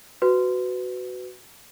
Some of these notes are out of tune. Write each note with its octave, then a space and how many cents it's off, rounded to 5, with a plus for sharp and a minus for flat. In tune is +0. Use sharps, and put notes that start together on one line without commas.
F#4 +0 B4 +20